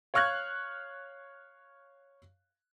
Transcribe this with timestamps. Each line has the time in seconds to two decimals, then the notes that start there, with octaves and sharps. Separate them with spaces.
0.14 C#5 F5 C#6 F6 F#6 G#6